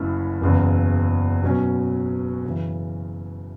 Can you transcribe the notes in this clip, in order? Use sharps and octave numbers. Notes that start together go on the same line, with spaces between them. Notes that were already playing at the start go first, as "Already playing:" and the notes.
Already playing: F#1 F#2 D3 A3 E4
F#1 E2 C#3
B2 F#3 C#4
F#2 C#3 E3